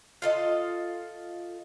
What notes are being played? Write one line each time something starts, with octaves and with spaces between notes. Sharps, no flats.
F4 A4 D#5